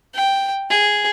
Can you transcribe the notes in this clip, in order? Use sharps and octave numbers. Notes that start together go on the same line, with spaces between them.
G5
G#4